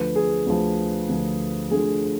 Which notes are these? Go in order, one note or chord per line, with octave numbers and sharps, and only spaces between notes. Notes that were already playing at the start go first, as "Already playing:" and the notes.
Already playing: D2 D3 F3 B4
G#4
D2 D3 F3
D2 D3 F3
D2 D3 F3 G#4